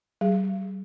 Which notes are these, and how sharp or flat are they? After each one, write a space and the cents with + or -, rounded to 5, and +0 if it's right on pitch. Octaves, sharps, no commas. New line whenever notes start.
G3 -35 G#4 +0